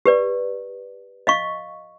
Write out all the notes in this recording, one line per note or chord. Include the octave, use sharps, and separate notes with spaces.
G4 B4 D5
D#5 F5 C#6